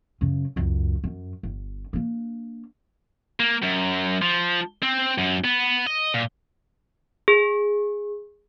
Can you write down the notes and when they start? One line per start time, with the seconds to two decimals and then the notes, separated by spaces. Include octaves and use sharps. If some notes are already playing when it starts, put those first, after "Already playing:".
0.21 F#2 C#3
0.56 C#2 F#2
1.04 F#2
1.43 G1
1.93 A#3 D4
3.40 A#3
3.63 F#2
4.22 F3
4.83 C4
5.18 F#2
5.44 B3
5.87 D#5
6.14 A#2
7.28 G#4